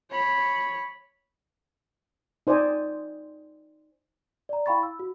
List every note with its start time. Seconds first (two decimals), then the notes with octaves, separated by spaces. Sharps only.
0.10 C#5 B5
2.47 D#4 C5 D5 D#5 G#5
4.49 D5 A#5
4.66 E4 F5 G5 B5 C#6 A6
4.83 E6
4.99 F#4